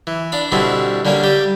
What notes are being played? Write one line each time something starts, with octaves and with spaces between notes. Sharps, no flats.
E3
D4 F5 B5
B2 D3 G3 C4 E4
D3 G3 A#3 C#4 A#4
G3 G4